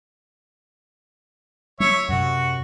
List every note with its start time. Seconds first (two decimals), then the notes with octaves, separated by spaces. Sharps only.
1.80 F#3 C#5 E5
2.09 F#2 C3 F#4